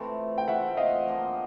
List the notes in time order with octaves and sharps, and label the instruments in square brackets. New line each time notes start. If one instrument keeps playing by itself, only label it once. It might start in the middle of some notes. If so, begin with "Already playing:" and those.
Already playing: [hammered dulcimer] E3 A3 C4 F4
[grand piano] G5
[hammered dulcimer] E3 A3 C4 F4 [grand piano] E5 F#5
[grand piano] D#5 F5
[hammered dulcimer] F3 A#3 D4 F4